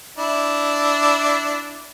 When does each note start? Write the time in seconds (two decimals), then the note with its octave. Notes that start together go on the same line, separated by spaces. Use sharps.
0.18 D4 E4